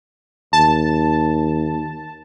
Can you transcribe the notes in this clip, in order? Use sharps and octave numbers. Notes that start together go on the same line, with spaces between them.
D#2 A5